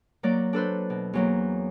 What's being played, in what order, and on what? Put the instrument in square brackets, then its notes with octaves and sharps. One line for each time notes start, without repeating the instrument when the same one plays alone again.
[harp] F#3 A#3 D5
D4 A4 B4 C5
B2
E2 F#3 A#3